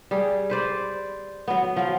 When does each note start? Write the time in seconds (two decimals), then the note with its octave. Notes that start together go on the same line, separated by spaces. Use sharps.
0.11 G3 G#4
0.50 B4 C5 D5
1.48 F#3 B3
1.76 F3 F#3